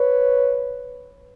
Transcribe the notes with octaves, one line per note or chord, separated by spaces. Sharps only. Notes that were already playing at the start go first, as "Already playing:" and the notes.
Already playing: B4 C#5